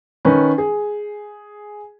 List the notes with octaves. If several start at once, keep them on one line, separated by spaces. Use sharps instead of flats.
D#3 C#4 B4
G#4